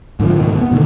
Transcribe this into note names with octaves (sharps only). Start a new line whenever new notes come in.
G#2 D3 E3 F3
D2 G#2 B2 D#3
G2 B3
B2 D3 D#3 A3